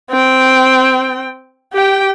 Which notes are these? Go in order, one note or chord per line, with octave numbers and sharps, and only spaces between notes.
C4 G5
G4 G5